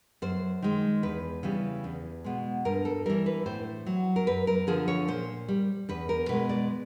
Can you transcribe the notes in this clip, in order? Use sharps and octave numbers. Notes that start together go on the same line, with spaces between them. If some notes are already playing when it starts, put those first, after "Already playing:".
F#2 C5
D#3 G#3
E2 B4
C#3 E3 G3
E2
B2 G#3
G2 A#4
A4
E3 G3 A#4
B4
A2 C5
F#3
A#4
F#2 B4
A#4
D3 F3 G#4
C#5
A#2 C5
G3
E2 B4
A#4
B2 G#3 B4
D5